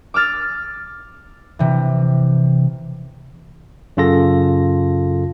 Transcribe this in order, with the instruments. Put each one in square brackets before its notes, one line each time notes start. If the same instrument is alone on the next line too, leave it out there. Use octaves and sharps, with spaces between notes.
[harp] D6 E6 F6 A6
C3 E3
[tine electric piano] F#2 C#3 F4 A4 A#6